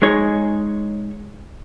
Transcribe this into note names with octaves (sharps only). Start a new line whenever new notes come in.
G#3 D#4 G#4 C#5